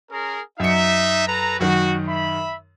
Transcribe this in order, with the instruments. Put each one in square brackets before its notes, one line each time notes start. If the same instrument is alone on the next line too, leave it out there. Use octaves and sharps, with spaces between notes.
[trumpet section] C#4 G#4 A#4
[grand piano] F#2 C#7 [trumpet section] D#4 E5
[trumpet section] A4 B4 A#5
[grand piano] F#2 D#3 [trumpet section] F#4
[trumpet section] E5 B5